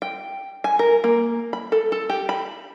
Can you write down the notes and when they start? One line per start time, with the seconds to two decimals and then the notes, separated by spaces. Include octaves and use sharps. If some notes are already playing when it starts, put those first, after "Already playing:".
0.02 G5
0.64 G#5
0.79 A#4
1.04 A#3
1.53 B5
1.72 A4
1.92 A4
2.10 G4
2.29 B5